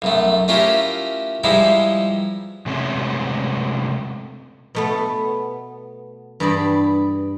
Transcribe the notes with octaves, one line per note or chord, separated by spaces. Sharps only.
B1 F#2 A3
A3 C#4 E4 F4 G4 A#4
E3 F3 G3 G#3 D#4 E4
C3 G#3 A3 C4 C#4
B2 A3 B3
G2 E3 G4 G#4 D5 B5